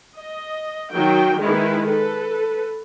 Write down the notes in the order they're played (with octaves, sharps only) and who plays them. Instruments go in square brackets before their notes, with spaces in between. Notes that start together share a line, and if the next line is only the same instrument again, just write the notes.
[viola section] D#5
D#3 F#3 G5
D#3 G#3 E4 B4
A4 B4